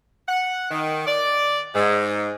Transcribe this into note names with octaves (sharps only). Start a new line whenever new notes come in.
F#5
D#3
D5
G#2